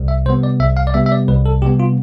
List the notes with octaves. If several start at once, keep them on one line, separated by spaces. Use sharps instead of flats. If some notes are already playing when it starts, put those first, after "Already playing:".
Already playing: C2
E5
C3 G3 B3 C5
D5
C2 E5
F5
D5
C3 G3 B3 E5
E5
D5
C2 B4
A4
C3 G3 B3 G4
F4